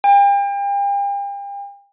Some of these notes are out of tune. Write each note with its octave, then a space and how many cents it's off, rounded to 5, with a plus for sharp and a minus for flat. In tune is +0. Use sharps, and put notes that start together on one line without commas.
G5 +40